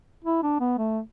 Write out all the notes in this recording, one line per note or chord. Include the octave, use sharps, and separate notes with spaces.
E4
D4
B3
A3